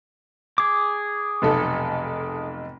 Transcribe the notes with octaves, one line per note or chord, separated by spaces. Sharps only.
G#4 D6
F1 B1 A4